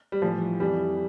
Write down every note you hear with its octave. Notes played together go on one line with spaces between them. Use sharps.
G3
A2 E3 F3
F2 E3 G3